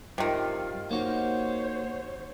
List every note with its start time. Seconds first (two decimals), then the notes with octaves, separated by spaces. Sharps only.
0.18 G2 C3 D#3 F4
0.91 A#3 D#4 F#4 C5 C#5